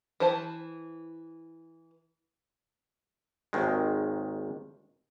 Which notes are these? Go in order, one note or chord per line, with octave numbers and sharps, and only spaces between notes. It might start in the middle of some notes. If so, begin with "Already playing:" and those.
E3 C5 A5
G#1 D#2 D#3 G#3